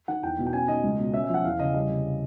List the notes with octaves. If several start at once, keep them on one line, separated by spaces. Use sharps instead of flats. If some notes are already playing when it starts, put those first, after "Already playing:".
D#3 F#5
E2 G5
B2
G5
C#4 G#5
D#3 D#5
C#2
B2
C#4 E5
E5
F3 F#5
E2 F5
C#3 D#5
G3 D#5
C3